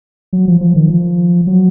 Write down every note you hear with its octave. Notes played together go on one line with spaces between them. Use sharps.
F#3
F3
F3
D#3
F3
F#3